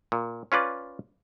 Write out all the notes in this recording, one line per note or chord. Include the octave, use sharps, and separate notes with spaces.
A#2
C#4 F4 B4 D5